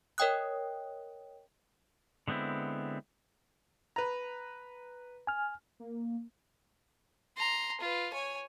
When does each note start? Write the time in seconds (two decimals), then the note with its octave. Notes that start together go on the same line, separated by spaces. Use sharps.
0.18 A#4 C#5 D#5 G5 D#6 F#6
2.28 D3 G#3 B3 C4 E4
3.96 B4 A#5
5.27 G#5 F6
5.80 A#3
7.38 A#5 C6
7.81 F4 B4
8.13 C#5 G#5